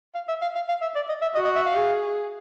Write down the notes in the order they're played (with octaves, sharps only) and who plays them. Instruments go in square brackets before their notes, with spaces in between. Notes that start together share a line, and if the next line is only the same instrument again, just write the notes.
[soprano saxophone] F5
E5
F5
F5
F5
E5
D5
D#5
E5
[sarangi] F#4 [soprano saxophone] D#5
[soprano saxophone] D#5
E5
F5
[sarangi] G#4